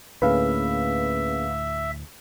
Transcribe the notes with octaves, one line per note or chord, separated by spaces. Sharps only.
D2 A2 A#3 C#4 G#4 B4 E5 F5